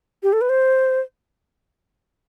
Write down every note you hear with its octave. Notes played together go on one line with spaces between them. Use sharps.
G4
A4
B4
C5